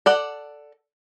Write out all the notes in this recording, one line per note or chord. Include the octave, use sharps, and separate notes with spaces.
A4 D5 F#5